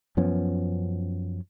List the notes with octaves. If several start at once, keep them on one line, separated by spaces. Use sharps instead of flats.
F#2 F3 B3 C#4